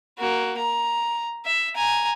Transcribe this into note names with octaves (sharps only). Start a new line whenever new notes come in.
A#3 F#4
A#5
E5
G#5 A#5